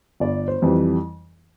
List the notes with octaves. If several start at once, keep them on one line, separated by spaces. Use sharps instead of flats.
G1 D5
C5
F2 E3 G3